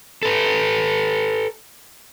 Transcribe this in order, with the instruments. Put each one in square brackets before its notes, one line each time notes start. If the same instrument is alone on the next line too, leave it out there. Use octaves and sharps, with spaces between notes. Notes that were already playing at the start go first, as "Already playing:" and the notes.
[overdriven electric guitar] A4 B4